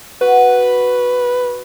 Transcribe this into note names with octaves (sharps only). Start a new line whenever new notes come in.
F#4 B4